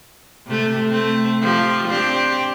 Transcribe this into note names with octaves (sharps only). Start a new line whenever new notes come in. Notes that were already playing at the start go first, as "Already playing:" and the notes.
C3 A3
A3 C4
F3 F4 G4
C4 D4 G4